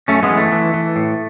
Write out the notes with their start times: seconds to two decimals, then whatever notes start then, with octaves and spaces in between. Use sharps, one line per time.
0.08 F#2 A3 C#4
0.23 G#3 B3
0.30 E3
0.38 A3
0.52 E3
0.74 E3
0.96 A2